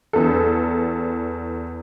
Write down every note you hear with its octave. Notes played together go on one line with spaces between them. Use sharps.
E2 A4